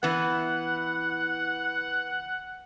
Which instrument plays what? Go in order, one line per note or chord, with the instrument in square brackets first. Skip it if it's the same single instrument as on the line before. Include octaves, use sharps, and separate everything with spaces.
[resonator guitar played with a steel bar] E3 B3 [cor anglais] F#5